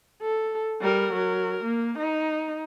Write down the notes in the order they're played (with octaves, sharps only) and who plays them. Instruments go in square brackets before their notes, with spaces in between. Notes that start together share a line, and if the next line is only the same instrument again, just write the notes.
[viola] A4
G3 A#4
F#3 A#4
A#3
D#4